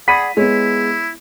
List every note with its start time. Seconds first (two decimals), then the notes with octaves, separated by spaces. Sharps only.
0.08 G#4 D5 F#5 B5 B6 D#7
0.37 G#3 B3 E4 C#5